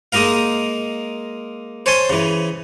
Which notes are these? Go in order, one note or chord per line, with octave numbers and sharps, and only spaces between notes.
G#3 A#3 D#4 A#4 F5
C5 C#5 G#5 A5 C6
C#3 E3